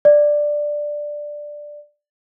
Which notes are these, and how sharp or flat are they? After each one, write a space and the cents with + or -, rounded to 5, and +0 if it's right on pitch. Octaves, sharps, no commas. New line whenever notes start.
D5 +5